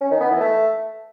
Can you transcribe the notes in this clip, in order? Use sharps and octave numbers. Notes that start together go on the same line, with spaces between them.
C#4
D#3
B3
E3
A3